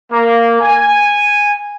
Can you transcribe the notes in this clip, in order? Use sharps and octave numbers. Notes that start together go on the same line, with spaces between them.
A#3
G#5